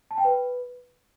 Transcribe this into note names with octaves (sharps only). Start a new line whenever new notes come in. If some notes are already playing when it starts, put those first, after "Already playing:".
A5
G5
B4